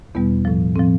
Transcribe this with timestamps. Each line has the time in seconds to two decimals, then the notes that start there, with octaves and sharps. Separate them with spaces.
0.15 E2 B2 G3 B3
0.45 A2 F3
0.76 A2 F3 C4